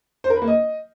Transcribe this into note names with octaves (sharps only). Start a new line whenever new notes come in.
C5
A#4
B4
A#3
D#5